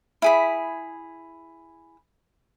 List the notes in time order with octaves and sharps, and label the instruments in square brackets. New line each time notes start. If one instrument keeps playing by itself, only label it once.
[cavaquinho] E4 G#4 B5